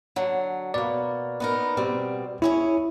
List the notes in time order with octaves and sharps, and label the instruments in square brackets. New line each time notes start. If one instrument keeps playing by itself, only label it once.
[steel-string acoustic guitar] D3 F#3
[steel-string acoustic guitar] B2 A#3 [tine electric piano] D5
[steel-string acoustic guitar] B3 D#4 A#4
B2 G3 C4
[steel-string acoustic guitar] C#4 G#4 C#5 [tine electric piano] E4